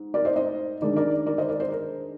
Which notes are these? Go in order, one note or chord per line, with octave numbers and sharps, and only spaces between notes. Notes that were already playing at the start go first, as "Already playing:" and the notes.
Already playing: G#2
A#4 D5
C5 D#5
C5 D#5
D#3 G#3 D4 A#4 D5
A#4 D5
A#4 D5
C5 D#5
A#4 D5
C5
A#4